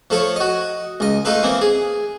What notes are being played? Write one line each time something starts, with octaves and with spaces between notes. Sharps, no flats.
F3 A3 A4 C#5
F#4 D#5
C#2 D#5
A3 D#4 F4 A4 B4
E3 A#3 C4
G#4